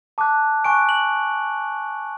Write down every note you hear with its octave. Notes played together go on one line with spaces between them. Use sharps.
A5 D6 F#6
G#5 C#6 F#6 D7
F#7